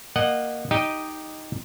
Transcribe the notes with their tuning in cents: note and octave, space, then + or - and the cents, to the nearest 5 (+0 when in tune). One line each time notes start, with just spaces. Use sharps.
A#3 +5 D#5 -25 F#5 +0
D#4 +0 G4 +0 D#5 +0